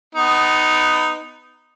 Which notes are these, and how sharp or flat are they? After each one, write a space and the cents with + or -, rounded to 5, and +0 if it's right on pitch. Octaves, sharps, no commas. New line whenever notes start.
B3 +20 D#4 +0